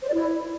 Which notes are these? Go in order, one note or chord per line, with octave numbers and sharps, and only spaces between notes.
C5
D5
E4